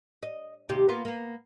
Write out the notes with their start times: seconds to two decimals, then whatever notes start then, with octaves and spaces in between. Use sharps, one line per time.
0.23 D#5
0.69 D#2 C3 G4
0.89 A#3 B3 F4
1.05 A#3 B3